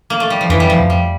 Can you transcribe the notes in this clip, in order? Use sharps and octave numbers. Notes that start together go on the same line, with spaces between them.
A#3
A3
G3
F3
F2 E3
G3
F3
F2
G3